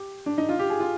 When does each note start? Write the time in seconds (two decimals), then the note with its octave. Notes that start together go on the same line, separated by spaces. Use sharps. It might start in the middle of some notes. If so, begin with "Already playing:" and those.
Already playing: G4
0.26 D4
0.38 D#4
0.49 F4
0.59 G4
0.70 G#4
0.80 F4